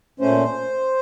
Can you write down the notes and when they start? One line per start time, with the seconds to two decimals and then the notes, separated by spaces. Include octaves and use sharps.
0.20 A#2 A3 C#4 C5